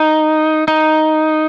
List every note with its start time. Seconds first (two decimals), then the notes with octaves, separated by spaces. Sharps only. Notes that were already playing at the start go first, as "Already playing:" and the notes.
Already playing: D#4
0.68 D#4